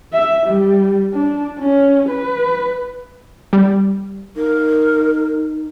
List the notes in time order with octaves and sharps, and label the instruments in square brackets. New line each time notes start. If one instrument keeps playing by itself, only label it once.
[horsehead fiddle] E5
G3
D4
C#4
B4
[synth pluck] G3
[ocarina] D#4 [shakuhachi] A#4